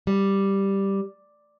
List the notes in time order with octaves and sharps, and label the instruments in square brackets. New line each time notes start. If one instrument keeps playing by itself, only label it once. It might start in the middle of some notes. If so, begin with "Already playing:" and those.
[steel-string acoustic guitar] G3